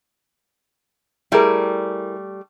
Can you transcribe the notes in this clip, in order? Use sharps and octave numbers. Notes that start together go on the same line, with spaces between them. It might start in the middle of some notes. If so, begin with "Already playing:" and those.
G3 A3 E4 G#4 A#4